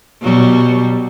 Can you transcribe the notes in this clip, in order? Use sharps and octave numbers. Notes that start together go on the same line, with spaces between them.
B2 F#3 G3